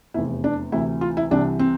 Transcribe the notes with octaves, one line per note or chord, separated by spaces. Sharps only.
F1 E2 C3 E4
D4
D2 C3 E3 E4
F4
E4
C2 C3 E3 D4
C4